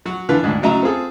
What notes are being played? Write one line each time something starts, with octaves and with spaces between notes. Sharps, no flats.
F#3 F#4
D3 E3 D4 F4 B4
D2 G#2 G#3 D4
A2 C#3 F#3 D#5 E5 A#5
C4 F4 G#4 A4